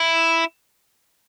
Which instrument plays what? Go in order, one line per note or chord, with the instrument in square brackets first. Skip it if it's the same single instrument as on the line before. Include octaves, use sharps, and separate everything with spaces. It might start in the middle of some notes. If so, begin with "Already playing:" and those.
Already playing: [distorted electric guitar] E4